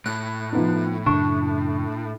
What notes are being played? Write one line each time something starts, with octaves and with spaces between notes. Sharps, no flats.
A2 F#6
F3 B3 D#4
F#2 C#3 D4 C#6